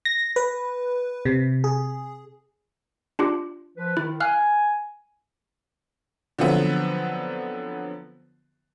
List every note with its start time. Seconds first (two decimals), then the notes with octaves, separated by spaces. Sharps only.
0.05 A#6
0.36 B4
1.25 C3
1.64 G#4
3.19 D4 F4 G4
3.77 F3 B4
3.97 D#3 E4
4.20 F5 G#5 F6 F#6
6.39 D3 F3 F#3 B3 C4